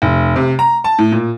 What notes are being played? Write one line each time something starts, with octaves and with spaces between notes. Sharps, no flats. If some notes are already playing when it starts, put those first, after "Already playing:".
F1
C3
A#5
A5
A2
A#2